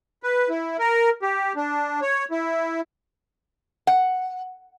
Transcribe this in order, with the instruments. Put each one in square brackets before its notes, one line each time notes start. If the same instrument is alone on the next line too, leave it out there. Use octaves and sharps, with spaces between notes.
[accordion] B4
E4
A#4
G4
D4
C#5
E4
[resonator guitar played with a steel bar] F#5